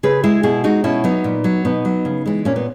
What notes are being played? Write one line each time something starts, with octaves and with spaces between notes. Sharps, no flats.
C#3 G#4 B4
G#3 E4 G#4
B2 E4 G#4
G#3 D#4 F#4
B2 C#4 E4
F#3 B3 D#4
A#2
F#3
B2 B3 D#4
F#3
C#3
E3 G#3
A#2 A#3 C#4
B3